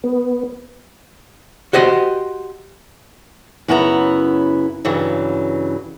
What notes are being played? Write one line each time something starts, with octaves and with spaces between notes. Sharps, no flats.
B3
F#4 G4 C5 D#5 F#5
F#2 C#3 B3 E4 G#5 A#5
G2 C#3 E3 F#3